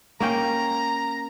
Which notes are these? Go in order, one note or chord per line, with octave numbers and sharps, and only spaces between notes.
A#3 C#4 G5 A#5